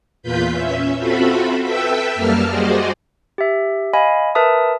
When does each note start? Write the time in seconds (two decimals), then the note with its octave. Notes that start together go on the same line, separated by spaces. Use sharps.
0.22 E2 A#2 F4 B4 B5 G6
0.52 C#4 E5
0.98 C4 F4 F#4 A4 E5 B5
1.64 A4 B4 E5 G5 B5 E6
2.15 F#2 G3 A#3 A5 F6
2.47 G3 F#4 G#4 C5 D5 D#5
3.38 G4 E5
3.93 D#5 F5 G#5 B5
4.35 A#4 B4 E5 A5 D#6